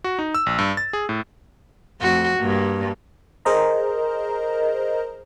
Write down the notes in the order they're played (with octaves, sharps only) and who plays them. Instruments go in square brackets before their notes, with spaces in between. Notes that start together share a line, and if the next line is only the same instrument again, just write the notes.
[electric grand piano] F#4
D#4
E6
A#1
G2
A6
G#4
A2
[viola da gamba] F2 A3 F#4
G2 A#3
[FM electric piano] G#4 A#4 C5 D#5 A#5